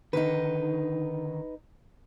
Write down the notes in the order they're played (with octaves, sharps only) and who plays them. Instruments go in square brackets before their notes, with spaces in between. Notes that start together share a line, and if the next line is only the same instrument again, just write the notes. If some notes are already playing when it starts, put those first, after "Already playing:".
[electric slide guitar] D3 D#3 [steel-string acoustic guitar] D#4 B4